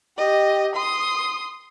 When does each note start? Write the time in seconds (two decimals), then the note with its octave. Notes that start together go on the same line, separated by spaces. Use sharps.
0.18 G4 D#5
0.76 C6 D#6